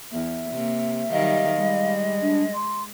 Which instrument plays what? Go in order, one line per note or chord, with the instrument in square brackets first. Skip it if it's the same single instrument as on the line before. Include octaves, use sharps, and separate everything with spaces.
[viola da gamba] E2 [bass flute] E5
[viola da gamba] C3 A#3
[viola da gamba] D#3 F#3 G3 [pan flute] D#5 [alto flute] F5
[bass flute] G3 [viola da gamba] G#3
[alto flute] D4
C6